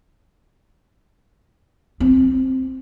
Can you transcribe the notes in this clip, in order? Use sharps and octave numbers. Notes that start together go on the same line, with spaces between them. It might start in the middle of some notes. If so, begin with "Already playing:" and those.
C4